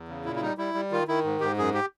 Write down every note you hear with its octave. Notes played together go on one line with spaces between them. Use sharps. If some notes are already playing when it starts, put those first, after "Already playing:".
Already playing: E2
C#3
A#2 E4
E4
G3 D#4
G3 E4
G3
D#3 F4
D#3 E4
G#2
G#2 G4
F#2 G#4
G4